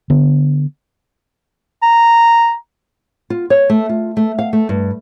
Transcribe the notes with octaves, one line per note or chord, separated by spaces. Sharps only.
D3 B3
A#5
F4
C#5
A3
F4
A3
F5
A3
G2